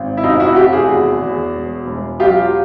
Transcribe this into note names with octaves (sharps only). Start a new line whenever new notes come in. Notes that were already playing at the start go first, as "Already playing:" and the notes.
Already playing: G#1
E4
F1 D#4 F4
E4 F#4
F1 F4 G4
F#4 G#4
E2
E2
E1
E1
F#3 F4 G4